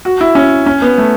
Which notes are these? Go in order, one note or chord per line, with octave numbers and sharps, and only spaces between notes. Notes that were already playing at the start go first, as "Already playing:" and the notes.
F#4
E4
C#4
C#4
B3
A3